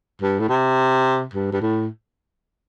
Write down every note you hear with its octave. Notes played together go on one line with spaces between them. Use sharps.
G2
A2
C3
G2
G2
A2